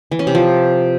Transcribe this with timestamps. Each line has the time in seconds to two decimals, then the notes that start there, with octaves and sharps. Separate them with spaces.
0.11 E3
0.19 C#4
0.27 C3
0.35 F3